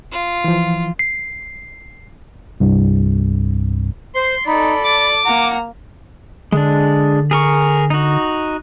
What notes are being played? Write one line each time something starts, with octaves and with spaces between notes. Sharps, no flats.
F4
E3 F3
C7
C2 G2
C5 C6
D#4 A4 D5 B5
D6
A#3 F#5 A#5
D3 G#3 D4
G#4 A#4 C#6
D#4 F#4